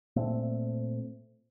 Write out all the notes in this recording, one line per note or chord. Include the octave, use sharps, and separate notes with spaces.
A#2 A3 C4